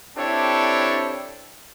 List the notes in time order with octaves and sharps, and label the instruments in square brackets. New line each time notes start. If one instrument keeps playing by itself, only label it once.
[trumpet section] C4 D4 E4 G4 A4 C#5